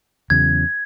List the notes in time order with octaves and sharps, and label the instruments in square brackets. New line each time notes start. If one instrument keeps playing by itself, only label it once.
[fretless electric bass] E2 C#3 F#3 [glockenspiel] G#6